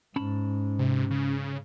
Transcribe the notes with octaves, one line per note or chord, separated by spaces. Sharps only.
G#2 C#4 A5 B5
C3
C#3